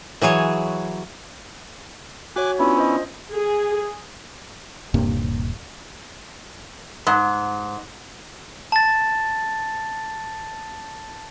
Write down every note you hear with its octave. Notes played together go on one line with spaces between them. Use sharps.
E3 F#3 G#4 C#5
F#4 C#5 G#5 D6 F#6
B3 C#4 D4 E4 F4
C5 D#5
G#4
D#1 G2 C3 A#3
G#2
A5 A6